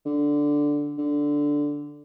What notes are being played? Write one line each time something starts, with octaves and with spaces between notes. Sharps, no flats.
D3
D3